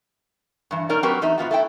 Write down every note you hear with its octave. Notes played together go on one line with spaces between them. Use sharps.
G2 E3
B2 D#4 A#4 C#5 D5
F#3 C4 F#4 G4 A#4 B4
E2 A3 D#4 E5
G#2 B3 F4 F#4
A3 E4 G5